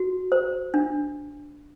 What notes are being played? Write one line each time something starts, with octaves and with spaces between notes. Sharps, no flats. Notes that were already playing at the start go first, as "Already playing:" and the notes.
Already playing: F#4
C5
D4